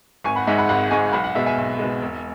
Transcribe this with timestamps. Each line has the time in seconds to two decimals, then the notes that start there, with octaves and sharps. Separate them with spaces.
0.24 G#1 G#5 C#6
0.35 F#5 B5
0.47 G#2 G#3 E5 G#5
0.58 F#5 B5
0.69 G#1 F#5 B5
0.91 G#2 G#3 G#5 C#6
1.12 B1 F#5 B5
1.24 F#5
1.35 B2 G#3 E5
1.46 E5 G#5
1.57 B1
1.79 B2 G#3
2.02 E1